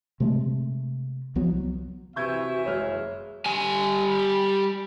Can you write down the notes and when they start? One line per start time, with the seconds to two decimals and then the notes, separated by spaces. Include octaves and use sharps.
0.20 C3 G#3 A3
1.35 C2 F3 F#3 B3
2.16 C3 E3 F#4 E5 C#6 G6 G#6
2.66 F#1 G#3 C#5 F6
3.46 G3 G#5